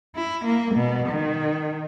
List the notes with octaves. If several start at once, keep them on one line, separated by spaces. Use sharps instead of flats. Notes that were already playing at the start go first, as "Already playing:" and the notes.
E4
A#3
B2
D#3